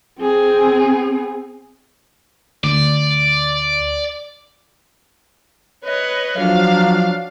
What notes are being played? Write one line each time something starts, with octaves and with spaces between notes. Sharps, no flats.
C4 G#4
D2 D5
B4 C#5 D#5
F3 F#3 D4 F5